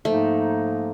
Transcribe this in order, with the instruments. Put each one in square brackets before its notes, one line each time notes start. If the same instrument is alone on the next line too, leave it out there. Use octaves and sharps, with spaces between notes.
[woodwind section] G#2 F3 A#3 D#4 [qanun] A3